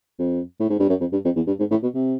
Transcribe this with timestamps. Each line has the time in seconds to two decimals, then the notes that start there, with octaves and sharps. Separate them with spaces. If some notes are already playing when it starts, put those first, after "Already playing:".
0.19 F2
0.60 A2
0.69 G#2
0.79 G2
0.89 F#2
1.00 F2
1.12 G2
1.24 F2
1.36 E2
1.47 G2
1.59 G#2
1.71 A2
1.83 B2
1.95 C3